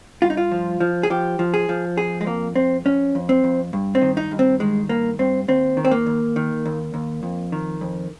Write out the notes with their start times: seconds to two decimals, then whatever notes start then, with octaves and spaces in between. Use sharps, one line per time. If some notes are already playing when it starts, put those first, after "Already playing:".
0.22 G2 F4
0.30 D#4
0.37 F4
0.52 F3
0.80 F3
1.03 G#4
1.10 F3 G4
1.39 F3
1.54 G#4
1.69 F3
1.97 F2 G#4
2.21 G#3
2.26 F2 A#3
2.56 F2 C4
2.85 F2 C#4
3.15 F2
3.29 C4
3.44 F2
3.73 G2
3.95 C4
4.01 D#3
4.17 D#4
4.31 G2
4.39 C4
4.60 D#3 G#3
4.89 G2 A#3
5.19 G2 C4
5.48 D#2 C4
5.77 D#3
5.85 C4
5.91 A#3
6.07 D#2
6.36 D#3
6.66 D#2
6.94 D#2
7.23 F2
7.52 D#3
7.81 F2